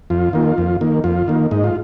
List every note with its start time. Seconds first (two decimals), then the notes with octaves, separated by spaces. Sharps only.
0.10 F2 F4
0.33 D#3 A#3
0.58 F2
0.81 D#3 A#3
1.04 F2 F4
1.28 D#3 A#3
1.51 G#2 D#4
1.64 F4